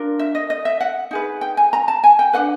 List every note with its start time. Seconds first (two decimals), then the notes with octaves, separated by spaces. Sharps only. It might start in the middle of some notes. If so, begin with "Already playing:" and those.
Already playing: D4 F4 A#4
0.19 E5
0.35 D#5
0.50 D#5
0.65 E5
0.81 F#5
1.11 D#4 G#4 B4
1.41 G5
1.57 G#5
1.73 A#5
1.88 A5
2.04 G#5
2.19 G5
2.33 D4 G4 B4 F#5